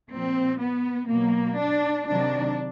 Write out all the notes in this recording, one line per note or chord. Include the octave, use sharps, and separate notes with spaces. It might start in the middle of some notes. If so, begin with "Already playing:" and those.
A#2 F3 C4
B3
B2 F#3 A#3
D4
C3 D#3 F#3 D4